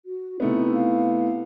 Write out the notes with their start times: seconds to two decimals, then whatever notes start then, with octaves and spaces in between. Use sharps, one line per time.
0.06 F#4
0.40 C3 A3 B3 D#4 E4
0.73 F5